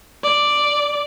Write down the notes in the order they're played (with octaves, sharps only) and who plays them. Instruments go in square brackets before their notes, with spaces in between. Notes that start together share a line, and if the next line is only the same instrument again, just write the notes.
[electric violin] D5